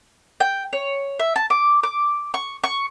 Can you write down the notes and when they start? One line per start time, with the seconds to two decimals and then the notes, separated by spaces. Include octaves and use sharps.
0.40 G5
0.73 C#5
1.19 E5
1.36 A5
1.50 D6
1.83 D6
2.34 C#6
2.64 C#6